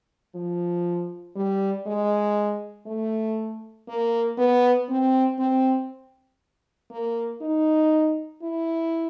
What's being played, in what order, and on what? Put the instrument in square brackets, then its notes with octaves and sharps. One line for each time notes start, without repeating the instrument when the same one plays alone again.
[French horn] F3
G3
G#3
A3
A#3
B3
C4
C4
A#3
D#4
E4